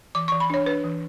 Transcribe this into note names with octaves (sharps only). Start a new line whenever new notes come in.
E3 D6
E3 C#6
B5
D4 C#5
D4 B4
E3